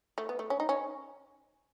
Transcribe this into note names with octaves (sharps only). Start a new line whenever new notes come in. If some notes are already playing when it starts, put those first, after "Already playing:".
A3
B3
A3
C#4
D#4
C#4